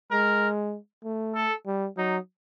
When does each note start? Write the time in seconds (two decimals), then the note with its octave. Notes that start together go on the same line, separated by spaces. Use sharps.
0.11 G#3 A#4
1.04 A3
1.35 A4
1.66 G3
1.97 F#3 D#4